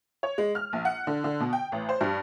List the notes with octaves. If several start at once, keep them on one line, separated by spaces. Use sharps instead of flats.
C#5
G#3
F6
A#1
F#5
D3
D3
B2
G5
A1
C5
G2